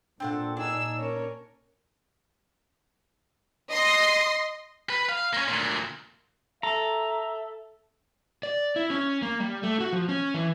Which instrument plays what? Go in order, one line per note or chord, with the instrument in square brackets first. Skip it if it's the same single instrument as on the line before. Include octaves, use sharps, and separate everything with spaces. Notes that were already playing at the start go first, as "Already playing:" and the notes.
[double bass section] A#2 [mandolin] C4 A4 F#5 [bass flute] D4
[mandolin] D4 [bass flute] D#4 [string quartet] G#4 E6
[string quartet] C#4 A#4 C#5
[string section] D#5 C6
[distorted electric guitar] B4
F5
A#3 C#4
D2 A#2
[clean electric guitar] A4 [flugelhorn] E5 [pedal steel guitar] A#5
[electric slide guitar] D5
E4
C#4
A#3
G3
A3
F#4
F3
C#4
E3